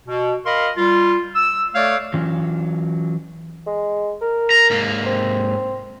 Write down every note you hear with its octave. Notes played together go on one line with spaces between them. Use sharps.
B2
A#4 D#5 F5 B5 C6
G3 F4
E6
A3 A4 C#5 D5 F5
E3 F#3 C#4 F4
G#3
A#4
A#5
G#2 A#3
C4